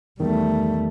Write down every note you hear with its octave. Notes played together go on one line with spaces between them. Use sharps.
E2 D#3 G3 A3